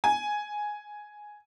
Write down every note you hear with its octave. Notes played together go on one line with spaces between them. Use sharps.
G#5